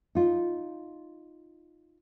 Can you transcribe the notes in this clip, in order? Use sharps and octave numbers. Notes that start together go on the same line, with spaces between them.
D#4 F4